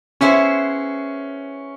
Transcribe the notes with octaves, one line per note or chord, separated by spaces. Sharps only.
B3 C#4 E4 G#4 C5